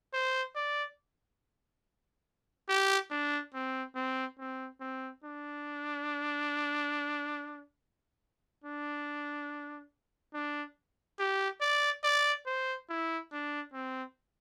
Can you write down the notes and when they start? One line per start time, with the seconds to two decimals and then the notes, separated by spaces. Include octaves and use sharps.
0.13 C5
0.55 D5
2.69 G4
3.11 D4
3.54 C4
3.95 C4
4.39 C4
4.80 C4
5.24 D4
8.64 D4
10.34 D4
11.19 G4
11.61 D5
12.03 D5
12.46 C5
12.90 E4
13.32 D4
13.73 C4